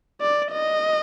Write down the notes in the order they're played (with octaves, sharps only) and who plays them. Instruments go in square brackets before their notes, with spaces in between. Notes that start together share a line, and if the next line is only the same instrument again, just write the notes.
[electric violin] D5
D#5